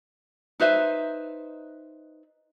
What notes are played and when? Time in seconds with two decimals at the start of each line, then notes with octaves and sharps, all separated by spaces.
0.60 D#4 B4 C5 E5